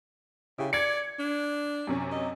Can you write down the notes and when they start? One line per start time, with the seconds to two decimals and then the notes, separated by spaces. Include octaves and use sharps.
0.58 C#3 E4 G4
0.73 D5 G#6 C#7
1.19 D4
1.87 F#2 C3 C#4
2.12 D#5